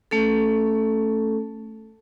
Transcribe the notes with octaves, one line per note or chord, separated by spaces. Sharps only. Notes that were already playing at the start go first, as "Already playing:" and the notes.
A3 C#4 A4